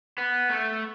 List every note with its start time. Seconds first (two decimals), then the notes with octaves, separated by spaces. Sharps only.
0.18 B3
0.49 A3